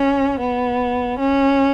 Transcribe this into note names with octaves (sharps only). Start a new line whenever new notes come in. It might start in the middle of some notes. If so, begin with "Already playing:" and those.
Already playing: C#4
B3
C#4